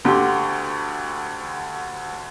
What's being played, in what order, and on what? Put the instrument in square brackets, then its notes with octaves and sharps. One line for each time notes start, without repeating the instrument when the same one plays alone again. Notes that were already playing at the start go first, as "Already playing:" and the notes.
[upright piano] D2 D3 G4 C6